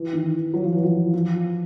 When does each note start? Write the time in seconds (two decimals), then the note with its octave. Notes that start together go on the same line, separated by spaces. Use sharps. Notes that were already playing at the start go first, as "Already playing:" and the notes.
Already playing: E3
0.13 D#3
0.33 E3
0.54 F#3
0.63 F3
0.72 E3
0.83 F3
1.13 F3